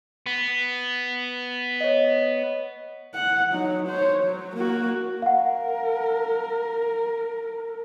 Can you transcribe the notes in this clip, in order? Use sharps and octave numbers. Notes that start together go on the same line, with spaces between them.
B3
C#5 D#5
F#5
F#3 D#4
C5 C#5
F#3
A#3 F#4
A#4 F5 F#5